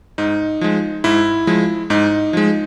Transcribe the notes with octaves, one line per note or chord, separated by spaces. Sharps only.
G#2 D#4
F3 G#3
G#2 E4
F3 G#3
G#2 D#4
F3 G#3